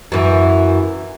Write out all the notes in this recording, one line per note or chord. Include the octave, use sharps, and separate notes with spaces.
F#2 E3